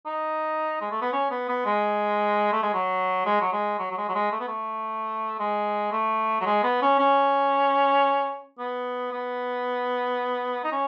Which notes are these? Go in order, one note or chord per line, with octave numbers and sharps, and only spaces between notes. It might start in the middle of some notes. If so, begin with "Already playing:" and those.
D#4
G#3
A3
B3
C#4
B3
B3
G#3
A3
G#3
F#3
G#3
F#3
G#3
F#3
F#3
G#3
F#3
G#3
A3
B3
A3
G#3
A3
F#3
G#3
B3
C#4
C#4
B3
B3
D#4
C#4